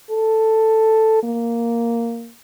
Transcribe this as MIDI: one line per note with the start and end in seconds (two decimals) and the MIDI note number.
0.10 1.21 69
1.23 2.30 58